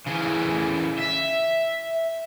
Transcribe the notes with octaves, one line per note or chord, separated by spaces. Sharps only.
C#3 E3
E5